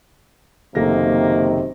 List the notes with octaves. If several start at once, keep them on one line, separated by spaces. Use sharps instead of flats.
F#1 C3 D#3 A3 A#3 A#6